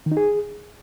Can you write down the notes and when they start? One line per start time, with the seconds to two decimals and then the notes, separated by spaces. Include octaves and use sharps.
0.06 D#3
0.11 D#4
0.17 G#4